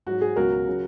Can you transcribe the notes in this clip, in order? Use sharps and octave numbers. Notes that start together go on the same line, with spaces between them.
G#2 F#3 F#4
G#4
C#2 B2 F#3 F#4 A#4
C#3 F#3